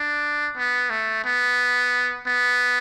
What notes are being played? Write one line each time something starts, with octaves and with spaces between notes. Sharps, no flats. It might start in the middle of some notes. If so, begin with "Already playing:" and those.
Already playing: D4
B3
A3
B3
B3